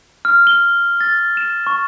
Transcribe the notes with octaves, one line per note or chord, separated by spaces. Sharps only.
F6
G7
A6
E7
C#6